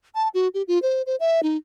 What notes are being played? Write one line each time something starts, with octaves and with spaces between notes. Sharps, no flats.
A5
F#4
G4
F4
C5
C5
E5
D#4